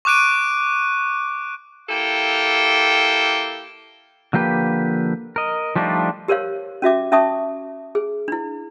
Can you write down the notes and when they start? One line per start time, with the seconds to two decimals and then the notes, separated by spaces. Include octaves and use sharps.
0.05 C#6 D6 F#6 D7 D#7
1.89 A#3 E4 G4 A4 F5 G5
4.33 D3 F3 A#3 G4 B4
5.36 A#4 D#5
5.76 F3 G3 A3 D4 D#4 F4
6.28 G4 A#4 C5 C#5 F5
6.82 C#4 F#4 E5 D6
7.12 C#4 E5 A5 C#6 D#6
7.95 G#4
8.28 D4 E4